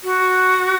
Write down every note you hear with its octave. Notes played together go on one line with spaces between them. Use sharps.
F#4